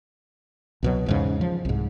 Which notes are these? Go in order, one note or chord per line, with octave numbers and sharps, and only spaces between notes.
C2 B2 F#3
E2 G#2 C#3
F3
C2 G#2